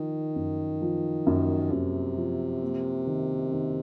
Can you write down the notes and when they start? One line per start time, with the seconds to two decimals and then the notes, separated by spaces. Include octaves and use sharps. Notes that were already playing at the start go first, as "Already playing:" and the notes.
Already playing: D#3 F3
0.36 F#2
0.82 F3
1.27 F#2
1.72 F#2 C3
2.17 F3
2.62 A#3
3.07 D#3
3.52 D#3